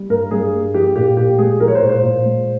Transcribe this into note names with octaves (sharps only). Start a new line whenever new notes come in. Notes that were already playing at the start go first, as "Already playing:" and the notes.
Already playing: G3
G2 A#4
G2 G#4
A#3
F3 G4
A#2 G4
A#2 G4
G#3 G#4
F3 A#4
C#5
C5
A#2
C5
A#2
G#3